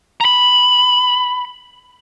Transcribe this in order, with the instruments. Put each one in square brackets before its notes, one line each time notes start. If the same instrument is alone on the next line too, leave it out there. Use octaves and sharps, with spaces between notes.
[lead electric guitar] A#5 B5